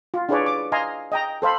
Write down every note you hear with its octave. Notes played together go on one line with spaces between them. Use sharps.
F4
D4 E4 G#4 B4 C#5 D5
D6
D#5 F5 G#5 A#5 C6
D#5 G5 A#5
A4 C5 F5 B5